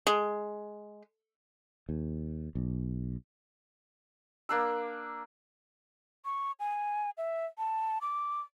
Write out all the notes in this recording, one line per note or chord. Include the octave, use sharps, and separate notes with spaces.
G#3
D#2
B1
A#3 D4 E6
C#6
G#5
E5
A5
D6